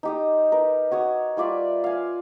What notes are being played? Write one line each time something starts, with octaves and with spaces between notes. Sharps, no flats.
D#4 G4 D#6
A#4 B4
F#4 C#5 C#6 D#6
G3 F4 D5 E5
F5 G#5